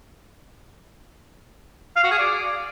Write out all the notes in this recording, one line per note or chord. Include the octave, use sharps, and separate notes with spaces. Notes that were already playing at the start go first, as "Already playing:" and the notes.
F5
F#4
G#4
D5